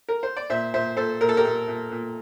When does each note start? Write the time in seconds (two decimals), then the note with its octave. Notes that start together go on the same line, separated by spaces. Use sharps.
0.09 A#4
0.23 C5
0.37 D5
0.50 A#2 C5 E5
0.74 A#2 C5 E5
0.97 A#2 A4 C5
1.21 A#2 A#4
1.29 A4
1.37 G4 A#4
1.44 A#2
1.68 A#2
1.91 A#2